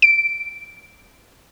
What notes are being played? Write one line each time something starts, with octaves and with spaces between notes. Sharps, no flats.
D7